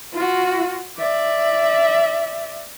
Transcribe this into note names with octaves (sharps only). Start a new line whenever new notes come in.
F4 F#4
D5 E5